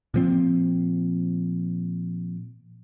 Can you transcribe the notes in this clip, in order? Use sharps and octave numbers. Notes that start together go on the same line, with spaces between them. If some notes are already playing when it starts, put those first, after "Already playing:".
A#2 F3 C4